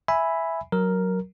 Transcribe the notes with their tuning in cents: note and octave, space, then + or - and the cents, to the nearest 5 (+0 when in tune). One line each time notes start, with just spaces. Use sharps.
E5 +0 G#5 +0 B5 +0
F#3 +0 A#4 +0